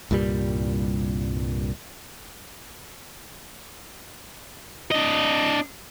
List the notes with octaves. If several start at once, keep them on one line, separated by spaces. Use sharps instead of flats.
C2 G2 A#2 G3
D4 D#5